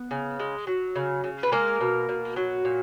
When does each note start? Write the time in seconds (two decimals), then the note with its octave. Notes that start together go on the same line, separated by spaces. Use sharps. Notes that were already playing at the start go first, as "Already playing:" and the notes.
Already playing: B3
0.11 C#3
0.40 G#3
0.67 F#3
0.96 C#3
1.24 C#3
1.43 B4
1.52 G#3 A#3 A#4
1.81 B2
2.09 B2
2.36 F#3
2.65 A#2